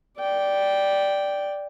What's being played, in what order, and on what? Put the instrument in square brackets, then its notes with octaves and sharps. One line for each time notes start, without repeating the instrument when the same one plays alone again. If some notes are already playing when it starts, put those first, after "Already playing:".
[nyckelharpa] D5 G5